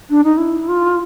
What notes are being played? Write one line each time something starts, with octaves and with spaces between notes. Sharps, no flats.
D4
D#4
E4
F4